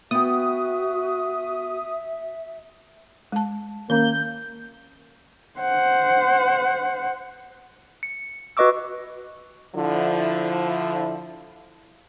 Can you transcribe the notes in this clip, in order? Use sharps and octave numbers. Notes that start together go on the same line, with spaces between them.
B3 F#4 E5 G5 D#6
G#3 A5
D#3 A#3 C#4 G6
C5 F#5
C#7
F#4 B4 D#5 C#6 D6 E6
D3 F3 E4